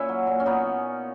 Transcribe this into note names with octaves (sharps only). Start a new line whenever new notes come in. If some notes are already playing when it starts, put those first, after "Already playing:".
Already playing: A#2 C#4 E4
F#3
A#2
C#4
A#2 B3 D#4